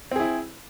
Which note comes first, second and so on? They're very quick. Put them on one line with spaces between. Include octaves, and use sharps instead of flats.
C4 G#4 E4